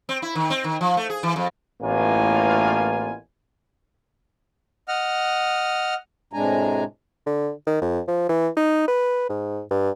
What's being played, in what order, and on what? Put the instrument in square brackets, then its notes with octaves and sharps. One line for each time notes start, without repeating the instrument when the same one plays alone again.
[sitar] C4
E4
D#3
C4
D#3
F3
A3
G#4
E3
F2
[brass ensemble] A1 A2 A#3 B3 F4 G#5
[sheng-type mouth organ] D#5 F#5 F6
[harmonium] A2 C3 G#3 D4 G#5 A#5
[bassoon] D3
D#3
F2
F3
E3
D#4
B4
G#2
G2